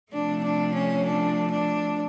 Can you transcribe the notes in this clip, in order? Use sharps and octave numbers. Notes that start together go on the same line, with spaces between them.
C3 F3 A3 D4
D4
C#4
D4
D4